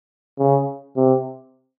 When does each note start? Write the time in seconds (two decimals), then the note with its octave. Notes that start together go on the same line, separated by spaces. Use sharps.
0.39 C#3
0.97 C3